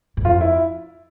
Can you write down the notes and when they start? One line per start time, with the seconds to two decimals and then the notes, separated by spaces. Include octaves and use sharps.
0.17 G#2
0.24 F2 F4
0.41 E4